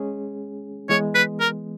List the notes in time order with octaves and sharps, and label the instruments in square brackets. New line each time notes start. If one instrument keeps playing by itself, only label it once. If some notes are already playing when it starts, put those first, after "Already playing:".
Already playing: [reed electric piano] G#3 C#4 G#4
[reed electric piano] E3 G#3 B3 [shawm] C#5
[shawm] B4
A#4